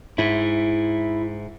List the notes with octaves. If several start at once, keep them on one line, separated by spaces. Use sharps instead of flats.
G#2 E4